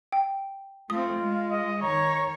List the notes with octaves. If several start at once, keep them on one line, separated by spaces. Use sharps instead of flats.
G5
A3 C4 F4 D#6
G#3
D#5
D#3 C#5 A#5 C#6